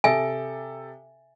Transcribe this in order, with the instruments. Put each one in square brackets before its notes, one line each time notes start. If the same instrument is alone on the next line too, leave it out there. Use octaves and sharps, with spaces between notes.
[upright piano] C3 A4 D#6 [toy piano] E5 G#5